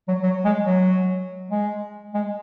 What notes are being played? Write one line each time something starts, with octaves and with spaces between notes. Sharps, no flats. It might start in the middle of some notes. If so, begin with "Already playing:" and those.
F#3
F#3
G#3
F#3
G#3
G#3